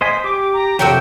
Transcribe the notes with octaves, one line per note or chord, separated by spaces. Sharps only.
C5 D#5 G#5 B6
G4 D6
A#5
F2 C3 F#3 G4 F#5 G5 E6